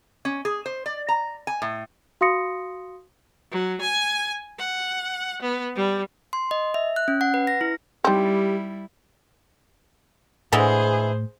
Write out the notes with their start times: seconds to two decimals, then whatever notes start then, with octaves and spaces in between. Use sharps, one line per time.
0.25 C#4
0.45 G#4
0.66 C5
0.86 D5
1.09 A#5
1.47 G#5
1.62 A2
2.21 F#4 F5 C6 D#6 A#6 C#7
3.52 F#3
3.81 G#5
4.58 F#5
5.42 B3
5.75 G3
6.33 C6
6.51 D#5
6.74 E5
6.96 F#6
7.08 C#4
7.21 F#5
7.34 B4
7.47 A#6
7.61 E4
8.04 G3 C4 D#4 E4 G4
10.53 A2 D3 E3 G#3 G#4 C5